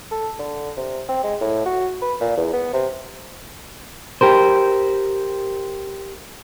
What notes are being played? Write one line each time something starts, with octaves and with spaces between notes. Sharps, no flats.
A4
D3
C3
C4
G#3
A2
F#4
B4
A#2
E2
B3
C3
G4 A#4 C5